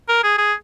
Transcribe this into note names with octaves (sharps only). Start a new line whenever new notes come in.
A#4
G#4
G#4